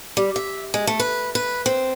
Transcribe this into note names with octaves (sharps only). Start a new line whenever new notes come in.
G3
E5
G#3
A3
B4
B4
C4